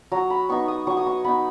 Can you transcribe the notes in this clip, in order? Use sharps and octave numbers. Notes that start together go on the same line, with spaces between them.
F#3 A#5
B5
B3 D#4 C#6
D#6
F#3 C#6
D#6
C#6
B3 D#4 B5